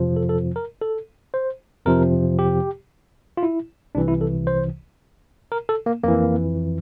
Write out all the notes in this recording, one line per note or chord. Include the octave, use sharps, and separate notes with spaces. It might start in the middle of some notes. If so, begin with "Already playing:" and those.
Already playing: F2 C3 F3
A4
A4
A#4
A4
C5
F2 C3 F3 A#4
G4
F4
E4
C2 C3 E3 D4
E4
A4
C5
A#4
A4
A#3
F2 E3 A#3